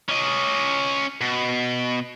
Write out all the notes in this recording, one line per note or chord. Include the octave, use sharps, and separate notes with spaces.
C#4 D#5
B2